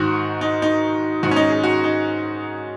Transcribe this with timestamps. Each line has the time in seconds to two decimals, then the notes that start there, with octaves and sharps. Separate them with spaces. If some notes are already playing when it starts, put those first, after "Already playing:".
Already playing: G#2 D#3 F#4
0.41 D#4
0.62 D#4
1.23 G#2 D#3 F#4
1.31 C#4
1.36 D#4
1.50 G#4
1.64 F#4
1.84 D#4